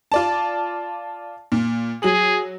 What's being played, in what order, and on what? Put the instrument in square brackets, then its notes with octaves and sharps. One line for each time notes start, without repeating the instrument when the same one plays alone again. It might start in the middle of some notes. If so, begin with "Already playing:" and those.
[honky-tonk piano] F4 D5 A5
A#2
[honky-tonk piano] F#3 F#7 [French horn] G#4